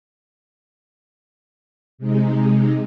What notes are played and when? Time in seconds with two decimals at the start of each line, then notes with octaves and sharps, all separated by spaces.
1.98 C3 G#3 D#4